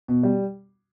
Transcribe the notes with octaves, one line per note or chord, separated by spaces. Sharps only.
B2
G3